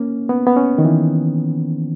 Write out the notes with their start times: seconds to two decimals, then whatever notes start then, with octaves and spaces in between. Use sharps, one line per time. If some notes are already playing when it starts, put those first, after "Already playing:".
Already playing: A#3 C#4
0.29 B3
0.47 B3
0.57 C#4
0.78 D#3
0.85 E3